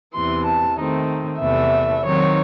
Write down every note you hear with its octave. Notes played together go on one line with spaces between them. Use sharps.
E2 C3 E3 C6
A5
D#3 A3 C4 D#4
E2 C3 E3 A3 E5
D#3 F#3 C4 D#4 C#5